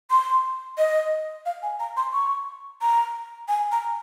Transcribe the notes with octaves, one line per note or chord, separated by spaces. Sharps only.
C6
D#5
F5
G#5
A#5
C6
C#6
A#5
G#5
A#5